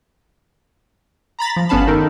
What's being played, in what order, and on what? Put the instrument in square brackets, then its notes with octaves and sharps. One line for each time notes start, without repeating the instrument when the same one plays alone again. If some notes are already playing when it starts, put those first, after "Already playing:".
[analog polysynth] A#5 B5 A6 B6
F3
G1 B3 C#4 F5 A5 B5
D#3 D#4 A4 A#4